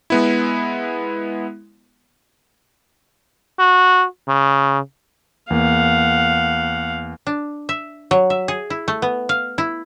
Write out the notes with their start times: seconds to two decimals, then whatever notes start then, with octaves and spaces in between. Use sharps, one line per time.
0.10 G#3 B3 E4
3.59 F#4
4.28 C#3
5.50 E2 A#3 F5 F#5
7.27 D4
7.69 E5
8.11 F#3
8.30 E5
8.48 G#4
8.70 E4
8.88 A3
9.02 B3
9.29 F5
9.58 E4